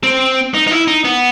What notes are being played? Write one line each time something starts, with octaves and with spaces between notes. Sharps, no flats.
C4
D#4
D#4
E4
D#4
B3